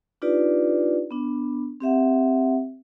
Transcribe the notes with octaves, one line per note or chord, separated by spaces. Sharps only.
D4 D#4 F4 G4 B4 D5
B3 D4
C4 G4 E5 F#5